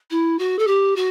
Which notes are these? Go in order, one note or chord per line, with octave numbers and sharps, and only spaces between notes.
E4
F#4
A4
G4
F#4